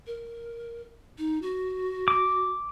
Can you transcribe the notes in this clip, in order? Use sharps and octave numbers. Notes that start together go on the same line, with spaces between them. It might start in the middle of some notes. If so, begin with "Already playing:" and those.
A#4
D#4
F#4
D6